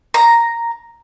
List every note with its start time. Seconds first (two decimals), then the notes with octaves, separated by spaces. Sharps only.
0.14 A#5